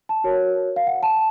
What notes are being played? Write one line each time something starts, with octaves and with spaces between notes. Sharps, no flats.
A5
F#4 A#4 C#5
F5
F#5
A5